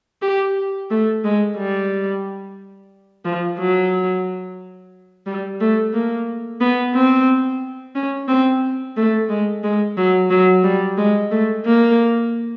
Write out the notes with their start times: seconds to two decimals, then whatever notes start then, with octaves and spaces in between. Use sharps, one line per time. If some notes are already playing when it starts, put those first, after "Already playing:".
0.22 G4
0.91 A3
1.24 G#3
1.57 G3
3.25 F3
3.59 F#3
5.26 G3
5.61 A3
5.93 A#3
6.61 B3
6.94 C4
7.95 C#4
8.28 C4
8.97 A3
9.29 G#3
9.64 G#3
9.97 F#3
10.30 F#3
10.64 G3
10.98 G#3
11.31 A3
11.66 A#3